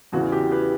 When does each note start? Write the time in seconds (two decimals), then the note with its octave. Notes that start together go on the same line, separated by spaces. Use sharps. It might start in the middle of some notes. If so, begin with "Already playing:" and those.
0.12 E2 C#3 E3 F#4
0.32 G4
0.51 G4 B4